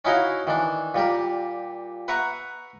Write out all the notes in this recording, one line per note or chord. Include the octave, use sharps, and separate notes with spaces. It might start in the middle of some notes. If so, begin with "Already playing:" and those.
C#4 D#4 E4 F#4 D#5 F5
D#3 E3 D4
A#2 G3 G4 A#4
B4 E5 F#5 A#5 C#6